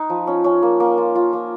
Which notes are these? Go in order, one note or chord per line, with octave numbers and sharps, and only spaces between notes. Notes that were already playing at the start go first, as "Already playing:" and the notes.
Already playing: D#4 B4
F3
C#4
C#4
A#3
A#3
F4
F4
A#3